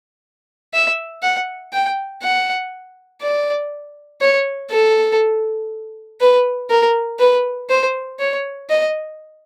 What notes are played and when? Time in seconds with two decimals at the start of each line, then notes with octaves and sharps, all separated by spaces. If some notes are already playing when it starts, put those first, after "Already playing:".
0.74 E5
1.22 F#5
1.73 G5
2.22 F#5
3.22 D5
4.21 C#5
4.70 A4
6.20 B4
6.70 A#4
7.19 B4
7.70 C5
8.19 C#5
8.69 D#5